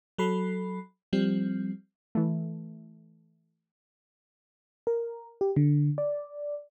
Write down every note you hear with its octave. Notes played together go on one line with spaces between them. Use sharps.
F#3 A4 B5 C7
F3 G3 C4
E3 A3
A#4
G4
D3
D5